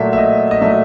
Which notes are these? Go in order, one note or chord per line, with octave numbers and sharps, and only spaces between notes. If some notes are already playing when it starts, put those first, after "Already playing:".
Already playing: A#2 F#3 A3 E5
E5
D#5
D#5
A#2 F#3 A3 E5